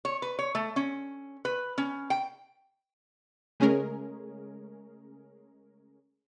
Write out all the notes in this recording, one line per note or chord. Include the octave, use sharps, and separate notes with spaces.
C#5
B4
C#5
A3
C#4
B4
C#4
G5
C#3 G#3 A3 C#4 G#4 A#4